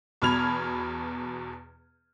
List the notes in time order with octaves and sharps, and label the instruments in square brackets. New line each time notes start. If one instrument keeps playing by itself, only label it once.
[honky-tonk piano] E2 B2 B5 F6 G#6 F7